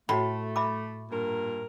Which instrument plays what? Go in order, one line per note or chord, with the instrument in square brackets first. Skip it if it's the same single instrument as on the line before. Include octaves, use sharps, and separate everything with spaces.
[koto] A2 [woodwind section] A3 [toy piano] F#4 B5
[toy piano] E5 B5 D6
[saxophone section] G2 A#2 A#4